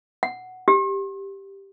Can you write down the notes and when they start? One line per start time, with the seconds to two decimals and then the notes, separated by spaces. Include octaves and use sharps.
0.23 F#5
0.68 G4